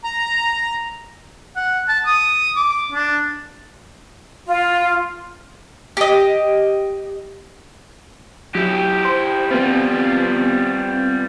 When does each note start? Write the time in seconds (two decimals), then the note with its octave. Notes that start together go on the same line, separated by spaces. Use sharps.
0.04 A#5
1.56 F#5
1.88 A5
2.06 D#6
2.56 D6
2.92 D4
4.47 F4
5.97 G4 D#5
8.55 F#3 E4 G4
9.05 C5
9.51 G3 B3 C4 F4